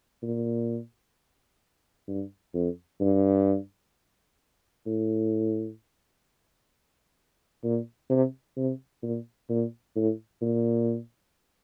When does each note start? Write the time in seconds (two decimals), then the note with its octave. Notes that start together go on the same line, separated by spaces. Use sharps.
0.22 A#2
2.08 G2
2.54 F2
3.00 G2
4.86 A2
7.64 A#2
8.10 C3
8.57 C3
9.03 A#2
9.49 A#2
9.96 A2
10.41 A#2